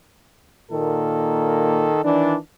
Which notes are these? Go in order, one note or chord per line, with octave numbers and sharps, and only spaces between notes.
A#2 D#3 A#3 A4
D#3 E3 D4